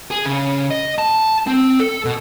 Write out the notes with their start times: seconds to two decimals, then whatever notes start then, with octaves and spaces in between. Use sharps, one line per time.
0.11 G#4
0.26 C#3
0.71 D#5
0.98 A5
1.47 C4
1.79 A4
2.05 B2